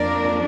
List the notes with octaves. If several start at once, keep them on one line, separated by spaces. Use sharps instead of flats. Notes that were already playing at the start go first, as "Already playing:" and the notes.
Already playing: F2 F3 A#3 D4 A#4 D5